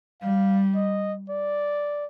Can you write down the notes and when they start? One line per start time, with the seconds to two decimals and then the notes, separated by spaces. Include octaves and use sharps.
0.22 G3 F5
0.75 D#5
1.30 D5